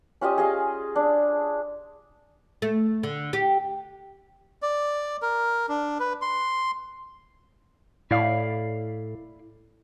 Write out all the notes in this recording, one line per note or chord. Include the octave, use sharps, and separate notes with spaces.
C#4 F4 G4 D#5
G#4 D#5 F5
D4
A3
D3
G4
D5
A#4
D4
B4
C6
A2 E4 D5 F5